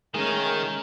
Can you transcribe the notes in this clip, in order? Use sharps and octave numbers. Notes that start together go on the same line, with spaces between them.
D#3 G#3 A3 C#4 G#4 A#4